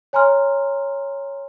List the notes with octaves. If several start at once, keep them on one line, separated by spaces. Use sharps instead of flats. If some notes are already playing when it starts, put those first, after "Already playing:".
C#5 G#5 A#5 C6 F6